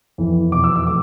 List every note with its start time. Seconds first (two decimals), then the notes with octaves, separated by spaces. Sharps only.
0.18 F2 E3 B3
0.52 E2 B2 B3 D6
0.64 E6
0.75 E6
0.87 F3 A3 D6